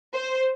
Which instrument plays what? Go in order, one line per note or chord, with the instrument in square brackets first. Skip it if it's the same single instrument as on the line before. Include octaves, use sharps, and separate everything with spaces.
[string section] C5